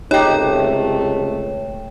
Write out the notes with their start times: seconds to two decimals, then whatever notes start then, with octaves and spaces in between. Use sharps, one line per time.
0.11 C#2 C3 A3 D#4 G4 C#5 G5